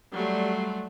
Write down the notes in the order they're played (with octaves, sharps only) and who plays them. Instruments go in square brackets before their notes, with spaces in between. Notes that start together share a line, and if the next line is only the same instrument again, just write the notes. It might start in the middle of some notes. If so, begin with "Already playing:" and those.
[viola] F#3 A3 [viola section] G3 C6